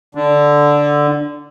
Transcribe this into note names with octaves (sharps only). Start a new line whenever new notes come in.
D3